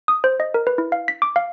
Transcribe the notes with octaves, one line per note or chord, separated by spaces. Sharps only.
D#6
C5
D#5
A#4
B4
E4
F5
B6
D6
F5